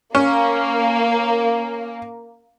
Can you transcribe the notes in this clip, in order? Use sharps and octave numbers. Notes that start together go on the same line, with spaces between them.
A#3 C#4